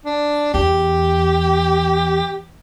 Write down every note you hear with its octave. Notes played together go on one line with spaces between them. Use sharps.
D4
E2 G4